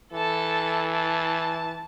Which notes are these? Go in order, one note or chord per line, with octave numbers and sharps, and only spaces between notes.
E3 A4 A5
A5